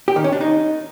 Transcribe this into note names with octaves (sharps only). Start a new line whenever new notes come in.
G4
D#3
C#4
D4
D#4